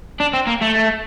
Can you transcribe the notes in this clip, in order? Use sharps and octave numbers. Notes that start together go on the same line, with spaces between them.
D4
C4
A#3
A3